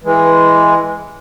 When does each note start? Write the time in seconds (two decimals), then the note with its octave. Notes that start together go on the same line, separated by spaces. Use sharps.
0.04 E3 G#3